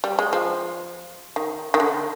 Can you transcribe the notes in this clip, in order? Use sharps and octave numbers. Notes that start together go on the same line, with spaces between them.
G3
G#3
F3
D#3
D#3
D3